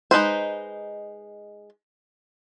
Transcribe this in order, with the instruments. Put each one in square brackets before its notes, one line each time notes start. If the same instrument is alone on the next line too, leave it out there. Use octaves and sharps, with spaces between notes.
[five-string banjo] G#3 D#4 B4 C5